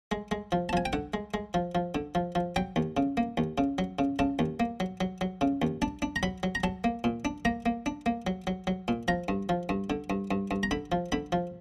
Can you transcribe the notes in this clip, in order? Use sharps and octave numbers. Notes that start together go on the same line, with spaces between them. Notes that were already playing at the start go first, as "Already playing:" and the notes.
G#3
G#3
F3
A5
F3 G#5
G5
D3 F#5
G#3
G#3
F3
F3
D3
F3
F3
F#3 G5
D#2
C#3
A#3
D#2
C#3
F#3
C#3
C#3 A5
D#2
A#3
F#3
F#3
F#3
C#3
D#2
D4 A5
D4
A#5
F#3 B5
F#3
A#5
F#3 A5
A#3
A#2
D4
A#3 A#5
A#3
D4
A#3
F#3
F#3
F#3
A#2
F3 A#5
G2
F3
G2
D3
G2
G2
G2
A#5
D3 B5
F3
D3 B5
F3